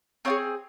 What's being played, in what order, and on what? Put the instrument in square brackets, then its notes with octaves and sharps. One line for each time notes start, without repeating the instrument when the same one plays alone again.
[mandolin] C4 F4 G#4 C#5